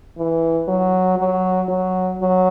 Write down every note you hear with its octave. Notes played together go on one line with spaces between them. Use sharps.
E3
F#3
F#3
F#3
F#3